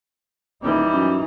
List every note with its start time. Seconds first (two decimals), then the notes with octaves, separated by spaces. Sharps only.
0.63 D#1 E3 G3 D#4
0.93 F#2